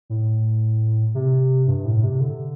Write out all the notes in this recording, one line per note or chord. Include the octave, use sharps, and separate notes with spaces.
A2
C3
G2
G2
A2
C3
D3